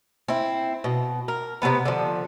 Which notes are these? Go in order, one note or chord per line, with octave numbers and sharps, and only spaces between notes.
C4 E4
B2
A#4
C3 G#3 B3 B4
D3 F3